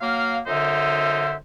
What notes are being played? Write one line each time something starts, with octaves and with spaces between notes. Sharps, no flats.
F#3 A#3 F5
F#2 D3 D#4 C5 E5